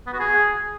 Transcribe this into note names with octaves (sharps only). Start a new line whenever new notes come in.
B3
F#4
G#4